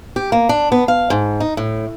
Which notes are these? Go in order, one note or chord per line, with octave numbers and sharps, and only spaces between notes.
G4
A#3
D4
B3
F5
G#2
D#4
A2